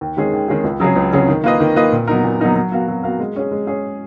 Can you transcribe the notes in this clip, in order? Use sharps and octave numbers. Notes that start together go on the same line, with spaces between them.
D#2
D#3 G#3 C#4 G#4
D#2
D#3 G#3 C#4 G#4
C#2
C#3 F#3 C#4 G#4
C#2
C#3 F#3 C#4 G#4
D#3
A#3 F4 B4 D#5
D#3
A#3 F4 B4 D#5
A#2
F#3 B3 D#4 A#4
A#2
F#3 B3 D#4 A#4
F#3
B3 F#4 A#4 F5
F#3
B3 F#4 A#4 F5
G#3
C#4 G#4
G#3
C#4 G#4